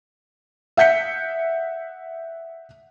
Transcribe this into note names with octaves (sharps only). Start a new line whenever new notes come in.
E5 F#5 G6 B6 C#7